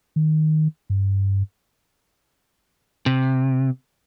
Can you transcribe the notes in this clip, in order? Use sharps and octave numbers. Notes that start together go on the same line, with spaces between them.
D#3
G2
C3